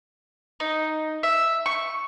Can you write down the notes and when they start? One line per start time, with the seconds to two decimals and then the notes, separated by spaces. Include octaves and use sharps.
0.60 D#4
1.23 E5
1.66 C#6